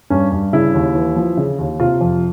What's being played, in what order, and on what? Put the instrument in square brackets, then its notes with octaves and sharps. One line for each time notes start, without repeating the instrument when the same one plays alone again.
[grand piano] G2 C#4
G2
C#3 E4
D#2
E3
F3
C#3
D#2
C3 F4
F2